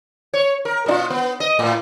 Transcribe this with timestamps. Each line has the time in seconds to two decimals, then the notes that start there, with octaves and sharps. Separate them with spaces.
0.34 C#5
0.65 A#4
0.86 B2 D4 F4
1.10 B3
1.40 D#5
1.59 A2